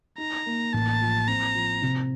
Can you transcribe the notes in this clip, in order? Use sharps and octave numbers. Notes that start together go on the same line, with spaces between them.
D#4 A#5
A#3
A1 A5
F3
C4 A#5
F3
C3